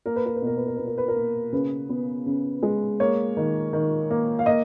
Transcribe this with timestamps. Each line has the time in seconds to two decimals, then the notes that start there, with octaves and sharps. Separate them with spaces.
0.06 A#3 A#4
0.16 B4
0.26 A#4
0.36 B4
0.42 B2 A#4
0.57 B4
0.67 A#4
0.77 B2 B4
0.87 A#4
0.98 B4
1.08 A#4
1.16 A#3
1.52 C#3 B4
1.89 B3
2.26 C#3
2.63 G#3
3.00 A#3 C#5
3.37 D#3
3.73 D#3
4.10 A#3
4.39 F5
4.46 A#3 D#5